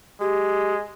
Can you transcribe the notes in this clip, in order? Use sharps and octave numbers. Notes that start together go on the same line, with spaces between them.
G#3 G4